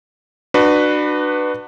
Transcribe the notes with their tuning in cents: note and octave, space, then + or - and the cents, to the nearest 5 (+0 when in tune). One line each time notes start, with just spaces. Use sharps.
D4 +30 F#4 +0 B4 +0